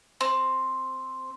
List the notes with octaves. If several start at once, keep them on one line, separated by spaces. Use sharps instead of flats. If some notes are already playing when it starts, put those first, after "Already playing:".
C4